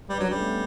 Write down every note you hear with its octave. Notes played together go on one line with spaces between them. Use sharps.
G3 B4
F#3 D4
C#4
G3 A3
B3
A3